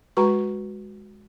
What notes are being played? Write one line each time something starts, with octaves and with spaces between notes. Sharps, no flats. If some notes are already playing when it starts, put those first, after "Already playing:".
G#3 F#4 B4 A#5 C#6